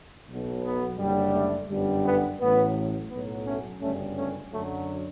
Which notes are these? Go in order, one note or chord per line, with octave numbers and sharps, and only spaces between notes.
B1 B2 F#3
B3
F#1 F#2 D3 G3
A3
G1 F#2 D3 G3
B3
A1 A2 F#3 B3
B1 A2 F#3 B3
A3 C#4
G1 F#2 C#3 G3 A3 C#4
A3 C#4
F#2 D3 F#3 A3